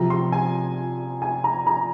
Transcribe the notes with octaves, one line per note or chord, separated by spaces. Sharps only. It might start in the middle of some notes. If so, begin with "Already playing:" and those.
Already playing: C3 F3 A#5
C6
G#5
G#5
A#5
A#5